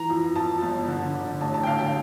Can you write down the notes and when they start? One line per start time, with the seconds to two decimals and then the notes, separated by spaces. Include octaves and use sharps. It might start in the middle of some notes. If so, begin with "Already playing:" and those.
Already playing: E3 A#5
0.10 F2
0.36 F2 A5
0.62 G1
0.88 D3
1.15 D3
1.41 A1 A5
1.54 A5
1.63 G5
1.67 D3 F5
1.80 G5